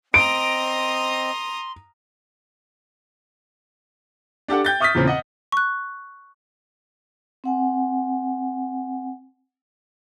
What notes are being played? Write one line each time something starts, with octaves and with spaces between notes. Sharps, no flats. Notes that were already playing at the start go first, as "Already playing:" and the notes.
C4 D#5 A#5 C6 D#6 D7
D4 G4 A4 F#5
G5 G6 A6
E5 C#6 D#6 F6 A6 B6
E2 A#2 C#3 C4
D#5 F#5
C#6 F#6
C4 F#5 G#5